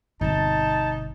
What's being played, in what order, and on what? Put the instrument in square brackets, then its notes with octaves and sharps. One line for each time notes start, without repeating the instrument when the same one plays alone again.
[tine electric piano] G1 [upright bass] B2 C4 [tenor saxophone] D#4 [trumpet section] A5